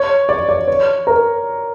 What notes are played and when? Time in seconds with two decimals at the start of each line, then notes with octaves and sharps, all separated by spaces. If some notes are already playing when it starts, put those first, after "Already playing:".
Already playing: C#5
0.29 D5
0.49 D5
0.68 C#5
1.07 A#4